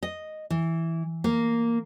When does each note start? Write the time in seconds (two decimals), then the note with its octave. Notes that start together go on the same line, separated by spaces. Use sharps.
0.03 D#5
0.50 E3
1.24 A#3